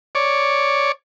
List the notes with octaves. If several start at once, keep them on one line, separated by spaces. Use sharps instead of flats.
C#5 D5